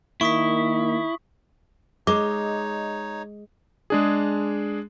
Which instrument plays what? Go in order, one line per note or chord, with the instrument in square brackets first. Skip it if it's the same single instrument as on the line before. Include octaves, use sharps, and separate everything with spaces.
[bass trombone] D#3 [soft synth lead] A#3 [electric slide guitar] E4 [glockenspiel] C#6 D#6 B6
[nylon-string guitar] G#3 [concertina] D#4 C#5 [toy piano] D6
[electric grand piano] G#3 D4 G#4